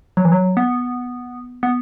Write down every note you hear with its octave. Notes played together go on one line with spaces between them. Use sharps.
F#3
E3
F#3
B3
B3